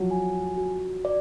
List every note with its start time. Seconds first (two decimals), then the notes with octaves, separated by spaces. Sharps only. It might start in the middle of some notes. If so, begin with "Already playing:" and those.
Already playing: F3 F#3
0.11 G#5
0.58 F#4
1.05 D5